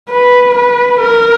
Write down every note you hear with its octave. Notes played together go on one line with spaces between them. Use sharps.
B4
B4
A#4